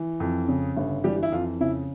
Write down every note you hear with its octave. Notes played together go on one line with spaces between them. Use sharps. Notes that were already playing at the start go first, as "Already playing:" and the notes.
Already playing: E3
F2
C#3
G1
E3 G3 G4
E4
F2 F4
C#3 E4